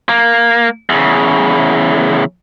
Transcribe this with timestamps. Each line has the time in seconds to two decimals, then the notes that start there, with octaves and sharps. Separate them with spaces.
0.09 A#3
0.89 E2 C#3